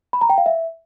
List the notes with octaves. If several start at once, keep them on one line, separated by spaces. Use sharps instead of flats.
B5
A#5
G5
F5
E5